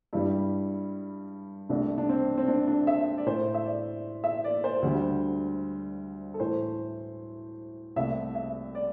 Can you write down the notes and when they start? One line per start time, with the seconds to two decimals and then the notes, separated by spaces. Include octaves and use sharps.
0.13 G2 G3 E4
1.69 C2 C3 A3 D4
1.98 D4
2.09 C4
2.38 C4
2.48 D4
2.67 D4
2.87 E5
3.17 D5
3.26 A2 A3 C5
3.54 E5
3.66 D5
4.24 E5
4.44 D5
4.64 C5
4.82 D2 D3 G3
6.34 A4
6.40 A2 E3 A3 C5
7.96 C2 C3 A3 E5
8.35 E5
8.75 D5